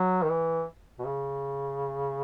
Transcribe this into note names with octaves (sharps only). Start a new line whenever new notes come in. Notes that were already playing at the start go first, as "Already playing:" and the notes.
Already playing: F#3
D#3
E3
B2
C#3